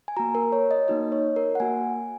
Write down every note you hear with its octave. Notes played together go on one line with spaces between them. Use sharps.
G#5
A#3 F#4 A#5
A#4
C#5
D#5
A#3 D#4 F#4 D#5
C#5
A#4
F#5
A#3 F#4 G#5